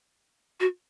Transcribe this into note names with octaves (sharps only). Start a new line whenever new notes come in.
F#4